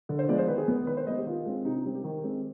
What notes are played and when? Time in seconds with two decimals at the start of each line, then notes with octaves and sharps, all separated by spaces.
0.09 D3
0.19 C5
0.28 F3 G#3 B3 D5
0.38 C5
0.48 D#3 B4
0.58 G#4
0.68 B3 B4
0.87 D#3 B4
0.97 C5
1.07 G#3 D#5
1.10 B3
1.17 G4
1.26 D#3 F4
1.46 G#3 C4
1.65 C3 D#4
1.75 D#4
1.85 G3 C4
1.95 G4
2.04 D#3
2.24 G#3 C4